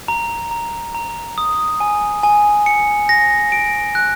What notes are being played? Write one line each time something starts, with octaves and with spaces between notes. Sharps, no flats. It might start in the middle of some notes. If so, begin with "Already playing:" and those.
A#5
A#5
A#5
D#6
G#5
G#5
C#7
A#6
D7
F#6